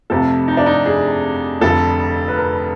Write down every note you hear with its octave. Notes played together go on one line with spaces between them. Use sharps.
F1 F2 C3 A4
D#4
D4
D#4
G#4
F1 F2 D3 A4
B4
A#4